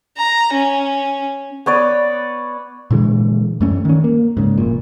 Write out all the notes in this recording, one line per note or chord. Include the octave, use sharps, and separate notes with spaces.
A#5
C#4
B3 C#5 D5
A#2 D3 E3 G#3
F#2 A3 C#4
D#3 C#4
A#3
G#2 C#3
F1 A#2